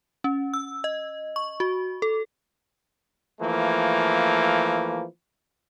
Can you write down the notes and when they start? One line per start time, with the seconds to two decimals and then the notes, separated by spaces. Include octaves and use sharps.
0.24 C#4
0.54 E6
0.84 D#5
1.36 C#6
1.60 F#4
2.02 A4
3.41 E3 F3 A3 A#3